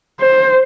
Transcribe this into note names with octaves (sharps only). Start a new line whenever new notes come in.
C5